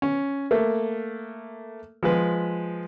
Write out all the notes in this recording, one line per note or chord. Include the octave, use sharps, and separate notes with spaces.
C#4
A3 A#3
F3 G#3 B4